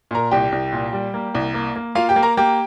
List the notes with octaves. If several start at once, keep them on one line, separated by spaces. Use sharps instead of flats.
A#2 A#4 A#5
C2 G4 G5
C2
A#2
G3
A#3
C2
A#3
A#3
A#3 F4 F5
G4 G5
A#3
A#4 A#5
A#3 G4 G5